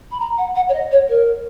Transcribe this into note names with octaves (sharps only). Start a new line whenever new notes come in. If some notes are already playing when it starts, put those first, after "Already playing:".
B5
A#5
F#5
F#5
C#5
D#5
C#5
A#4